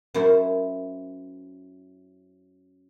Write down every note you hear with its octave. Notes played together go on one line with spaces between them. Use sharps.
F#2 E4 C5